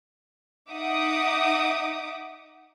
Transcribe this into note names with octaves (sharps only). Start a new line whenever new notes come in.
D#4 E5 F#5 D6 D#6